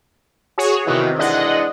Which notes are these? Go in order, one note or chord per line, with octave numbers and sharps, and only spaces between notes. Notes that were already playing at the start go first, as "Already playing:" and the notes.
F#4 G#4 C#5
C3 D#3 E3 B3 F#4
E3 G#3 D4 D#5 F#5